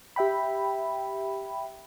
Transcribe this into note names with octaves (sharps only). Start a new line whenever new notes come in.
G4 E5 G5 B5